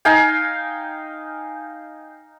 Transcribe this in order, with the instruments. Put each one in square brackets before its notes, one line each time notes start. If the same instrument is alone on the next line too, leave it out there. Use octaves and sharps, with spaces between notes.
[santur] D#4 F5 G5 G#5